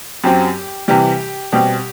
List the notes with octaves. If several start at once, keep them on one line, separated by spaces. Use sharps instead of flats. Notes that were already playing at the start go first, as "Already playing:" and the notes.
F#2 F#3 C4 G4
C3 E3 G3 G4
B2 G3 C4 G4